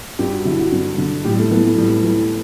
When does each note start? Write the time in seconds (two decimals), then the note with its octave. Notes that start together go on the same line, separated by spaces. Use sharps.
0.19 G2 G4
0.32 F#4
0.45 D3 E4
0.60 F#4
0.72 G2
0.98 D3
1.25 A2 G4
1.32 G3
1.38 A3
1.51 E3 B3
1.64 A3
1.77 A2 G3
2.03 E3